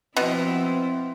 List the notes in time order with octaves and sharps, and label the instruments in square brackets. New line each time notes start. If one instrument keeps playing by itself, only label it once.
[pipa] B2 [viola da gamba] F3 E4 [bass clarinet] C4